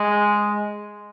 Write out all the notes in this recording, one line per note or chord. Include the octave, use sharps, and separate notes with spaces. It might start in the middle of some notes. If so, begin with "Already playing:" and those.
Already playing: G#3